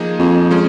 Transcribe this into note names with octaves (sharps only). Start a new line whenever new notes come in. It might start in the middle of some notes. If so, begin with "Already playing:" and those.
Already playing: F3 A#3 D#4 G#4
F2
F3 G#3 C#4 G#4